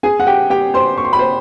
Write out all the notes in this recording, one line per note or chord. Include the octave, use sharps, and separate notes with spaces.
G#4 G#5
F#5
G4 G5
G4 G5
C5 C6
C#6
C6
B5
C5 C6